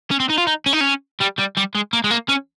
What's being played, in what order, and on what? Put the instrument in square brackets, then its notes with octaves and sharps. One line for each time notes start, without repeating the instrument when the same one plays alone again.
[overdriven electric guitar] C#4
C4
D#4
F4
D#4
C#4
D#4
C#4
G3
G3
G3
G#3
A#3
G#3
A#3
C#4